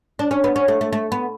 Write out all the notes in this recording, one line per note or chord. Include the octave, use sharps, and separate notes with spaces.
D4
C#4
B3
C#4
A3
A3
A3
B3